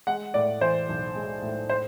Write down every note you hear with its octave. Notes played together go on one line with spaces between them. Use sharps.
G#3 F#5
A2 D5
E3 C5
B1
G#3
A2
C5